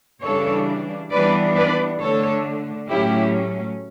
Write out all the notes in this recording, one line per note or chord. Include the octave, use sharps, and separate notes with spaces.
C#3 E3 G3 D4 A4 C#5
E3 G3 B3 D4 B4 D5
B4 D5
D3 A3 D4 A4 C#5
A2 F#3 A3 C#4 E4 G4